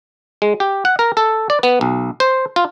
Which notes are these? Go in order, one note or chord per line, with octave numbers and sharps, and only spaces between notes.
G#3
G4
F#5
A#4
A4
D5
B3
B1
C5
F4